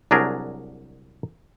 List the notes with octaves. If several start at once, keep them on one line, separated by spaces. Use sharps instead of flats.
C2 F#3 D4 G#4 A#4